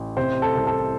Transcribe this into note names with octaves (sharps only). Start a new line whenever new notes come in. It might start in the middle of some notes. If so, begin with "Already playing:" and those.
Already playing: A1
C3 C5
A4
C2
A4